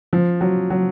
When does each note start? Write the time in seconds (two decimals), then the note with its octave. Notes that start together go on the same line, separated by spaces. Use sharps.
0.13 F3
0.41 F#3
0.70 F#3